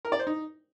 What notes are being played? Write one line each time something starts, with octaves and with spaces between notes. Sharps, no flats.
A#4
D5
C5
D#4